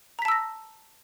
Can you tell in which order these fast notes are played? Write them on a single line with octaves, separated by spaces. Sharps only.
A#5 B6 A5 E6 A#6